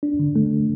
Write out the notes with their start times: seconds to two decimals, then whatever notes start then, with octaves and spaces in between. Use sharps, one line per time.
0.03 D4
0.20 D3
0.36 A3